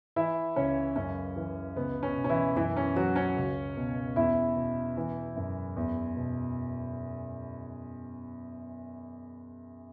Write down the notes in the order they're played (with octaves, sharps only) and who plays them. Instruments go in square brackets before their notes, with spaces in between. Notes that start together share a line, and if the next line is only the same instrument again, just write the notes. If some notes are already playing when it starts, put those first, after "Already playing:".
[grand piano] E3 E4 E5
C#2 C#4 C#5
F#2 C#4
E3
C#2 B3
C#4
B2
C#4
E3 E4
F#2 E3 E4
C#4
E3 F#3 F#4
C#4 C#5
C#2
B2
E2 E4 E5
B2
E3
F#2
E2
B2